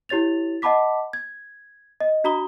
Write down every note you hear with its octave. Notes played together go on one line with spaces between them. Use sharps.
E4 G4 C#5 A6 F7
D#5 F#5 A5 B5 D6 B6
G#6
D#5
D4 F#4 A#5 B5 D#6 G7